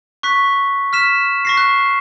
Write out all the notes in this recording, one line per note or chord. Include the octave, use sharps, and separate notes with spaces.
C#6 F#6 B6
F6 B6 E7
C#6 A#6 C7
F#6